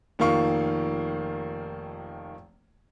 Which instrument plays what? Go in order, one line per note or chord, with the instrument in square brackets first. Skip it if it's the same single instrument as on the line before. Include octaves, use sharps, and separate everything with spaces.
[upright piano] F1 D#3 F3 A#3 F5 C#6